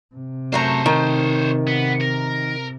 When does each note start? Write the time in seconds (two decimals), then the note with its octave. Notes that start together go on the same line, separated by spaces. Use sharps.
0.15 C3
0.52 F#2 A3 C5 C#5 A#5
0.86 D#3
1.67 B3
2.00 A#4